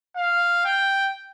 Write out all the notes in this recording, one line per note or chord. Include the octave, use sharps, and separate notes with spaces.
F5
G5